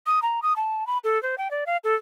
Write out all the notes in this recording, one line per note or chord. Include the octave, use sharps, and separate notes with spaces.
D#6
A#5
D#6
A5
B5
A4
C5
G5
D5
F5
A4